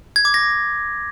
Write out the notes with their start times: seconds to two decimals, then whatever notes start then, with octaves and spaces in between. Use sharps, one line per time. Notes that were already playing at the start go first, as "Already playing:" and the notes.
0.16 G#6
0.25 D6
0.34 A#6